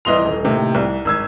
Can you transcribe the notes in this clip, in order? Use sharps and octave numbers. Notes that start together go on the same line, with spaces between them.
C2 E3 D#5 C6 F7
D#1
A2 C3 D#3 A#3
C2
G#1 E6 G#6